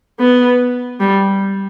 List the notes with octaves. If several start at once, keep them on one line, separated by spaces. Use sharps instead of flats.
B3
G3